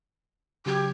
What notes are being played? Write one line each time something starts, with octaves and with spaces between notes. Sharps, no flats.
C#3 F#3 G4 G#6